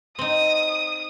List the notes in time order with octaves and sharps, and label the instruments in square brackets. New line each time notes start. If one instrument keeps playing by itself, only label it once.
[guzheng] C4 D#4 [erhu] D#6